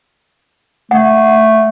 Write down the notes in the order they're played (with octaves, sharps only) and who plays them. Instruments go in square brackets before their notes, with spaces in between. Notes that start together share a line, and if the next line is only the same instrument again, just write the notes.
[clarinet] A3 [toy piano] F#5